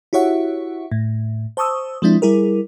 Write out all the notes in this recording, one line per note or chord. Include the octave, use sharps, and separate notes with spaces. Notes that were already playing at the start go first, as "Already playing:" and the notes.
E4 F#4 G4 C#5 E5 F#5
A2
C5 A5 C#6 D#6 E6
F3 G#3 C4 D4 E4
G3 E4 G#4 A#4